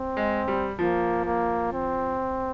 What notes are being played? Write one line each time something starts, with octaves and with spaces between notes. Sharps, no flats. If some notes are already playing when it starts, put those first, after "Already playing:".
Already playing: C4
G#3
G3
F3 A#3
A#3
C4